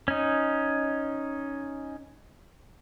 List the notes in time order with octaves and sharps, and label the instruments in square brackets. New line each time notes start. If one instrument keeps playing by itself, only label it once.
[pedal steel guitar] C#4 D#4